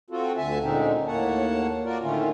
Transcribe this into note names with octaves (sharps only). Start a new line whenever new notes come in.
C4 F4 F#4 A4
D2 D3 E5 G#5 A5
A#2 D3 G#3 C4 C#4 D#4
D#2 A2 A#3 C#5 F#5 A5
F4 F#4 A#4 D5
A2 D3 D#3 A3 C#4 F4